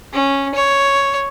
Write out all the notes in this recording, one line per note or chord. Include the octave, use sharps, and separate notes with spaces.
C#4
C#5